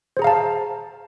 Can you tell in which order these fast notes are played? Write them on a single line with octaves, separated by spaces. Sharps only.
C5 G#4 A#5 F5 A5